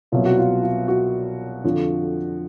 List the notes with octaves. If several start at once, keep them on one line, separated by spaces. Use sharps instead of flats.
C2 B2 F#3 F4
F#4
F4
F4
F#4
F2 D3 F3